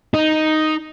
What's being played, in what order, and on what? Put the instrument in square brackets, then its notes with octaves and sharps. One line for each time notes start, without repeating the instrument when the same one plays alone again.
[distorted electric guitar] D#4